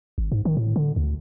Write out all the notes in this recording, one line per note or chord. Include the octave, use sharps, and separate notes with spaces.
G#1
G#2
D#3
A2
D3
D2